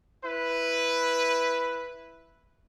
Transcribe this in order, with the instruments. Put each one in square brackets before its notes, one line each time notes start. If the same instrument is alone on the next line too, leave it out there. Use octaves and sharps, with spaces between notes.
[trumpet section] E4 B4